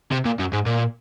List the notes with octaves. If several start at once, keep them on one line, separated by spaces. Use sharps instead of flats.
C3
A#2
F#2
G#2
A#2